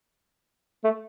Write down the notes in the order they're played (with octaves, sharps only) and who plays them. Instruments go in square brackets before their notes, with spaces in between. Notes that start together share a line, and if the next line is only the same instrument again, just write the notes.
[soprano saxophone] A3